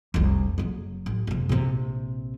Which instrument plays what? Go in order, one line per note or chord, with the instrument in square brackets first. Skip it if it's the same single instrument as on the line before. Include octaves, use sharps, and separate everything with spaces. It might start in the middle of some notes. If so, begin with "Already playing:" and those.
[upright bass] F1 C2
F#1 F#3
A1
F#1 C3
A#1 C3